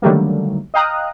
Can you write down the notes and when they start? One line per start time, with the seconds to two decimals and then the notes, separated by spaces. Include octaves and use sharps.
0.02 D3 D#3 F#3 G3 A3 A#3
0.74 D#5 F5 G5 A#5 D#6 F#6